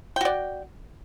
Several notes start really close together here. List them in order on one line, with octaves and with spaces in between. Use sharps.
G5 F#4 D5